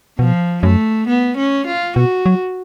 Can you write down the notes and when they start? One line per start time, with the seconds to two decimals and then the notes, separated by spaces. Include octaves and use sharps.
0.19 B2 F3
0.63 F#2 A3
1.08 B3
1.37 C#4
1.66 F4
1.96 B2 F#4
2.26 F#3